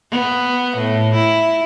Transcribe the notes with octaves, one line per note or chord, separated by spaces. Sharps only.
B3
A2
E4